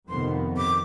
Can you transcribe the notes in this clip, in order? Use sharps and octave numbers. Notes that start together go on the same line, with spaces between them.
F2 C3 D#3 B3 C6
D6